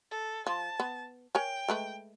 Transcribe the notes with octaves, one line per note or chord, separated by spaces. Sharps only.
A4
F3 A5
B3
A#4 C#5 G5 G#5
G#3 A3 B4